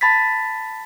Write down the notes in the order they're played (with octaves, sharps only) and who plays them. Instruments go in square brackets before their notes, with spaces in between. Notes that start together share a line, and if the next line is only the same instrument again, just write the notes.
[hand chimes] A5 B5 A6 B6